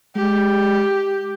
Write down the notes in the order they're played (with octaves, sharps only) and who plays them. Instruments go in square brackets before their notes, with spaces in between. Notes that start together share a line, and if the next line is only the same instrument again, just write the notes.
[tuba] G#3 [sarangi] G4